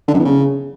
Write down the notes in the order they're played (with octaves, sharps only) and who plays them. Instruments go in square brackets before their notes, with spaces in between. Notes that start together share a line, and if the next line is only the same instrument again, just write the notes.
[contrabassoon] D3
F#2
E2
C#3